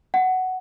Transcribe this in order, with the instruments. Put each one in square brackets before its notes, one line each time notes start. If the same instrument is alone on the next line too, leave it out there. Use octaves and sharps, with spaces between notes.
[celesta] F#5